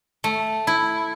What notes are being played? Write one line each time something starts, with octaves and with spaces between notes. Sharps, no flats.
A3
E4